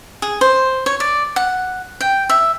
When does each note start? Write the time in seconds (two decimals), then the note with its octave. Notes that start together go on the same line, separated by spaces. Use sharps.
0.22 G#4
0.41 C5
0.86 C#5
1.00 D5
1.36 F#5
2.01 G5
2.29 E5